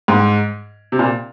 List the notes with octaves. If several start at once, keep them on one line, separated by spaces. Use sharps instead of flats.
G#2
C3
A#2